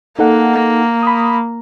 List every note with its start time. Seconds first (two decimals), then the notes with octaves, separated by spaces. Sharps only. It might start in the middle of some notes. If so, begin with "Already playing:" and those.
0.19 A#3 D#4 A4 F#5
1.03 B5 D#6